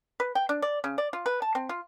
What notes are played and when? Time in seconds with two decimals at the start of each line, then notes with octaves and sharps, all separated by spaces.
0.20 B4
0.35 G5
0.49 D4
0.62 D5
0.84 C#3
0.98 D5
1.13 F4
1.26 B4
1.42 A5
1.55 C4
1.69 F4